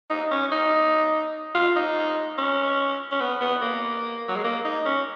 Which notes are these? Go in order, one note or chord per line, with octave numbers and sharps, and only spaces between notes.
D#4
C#4
D#4
F4
D#4
C#4
C#4
B3
B3
A#3
F#3
G#3
A#3
D#4
C#4